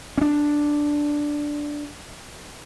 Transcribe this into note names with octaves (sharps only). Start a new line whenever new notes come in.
C#4 D4